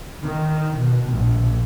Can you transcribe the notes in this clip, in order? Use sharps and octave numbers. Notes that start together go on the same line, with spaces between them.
D#3
B2
A#1